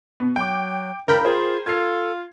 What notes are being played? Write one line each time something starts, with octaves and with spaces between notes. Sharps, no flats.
B2 B3
F#3 G5 D6
C#2 E3 D4 A#4 G5 B5
F4 G#4 C5
F4 A4 G#6 C7